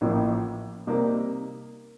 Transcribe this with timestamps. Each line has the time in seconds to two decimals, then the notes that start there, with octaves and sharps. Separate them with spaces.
0.01 A1 A2 F3 A#3
0.87 C3 G3 A#3 D#4 A#4